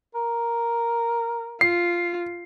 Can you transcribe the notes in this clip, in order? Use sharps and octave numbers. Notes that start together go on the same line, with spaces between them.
A#4
F4 C7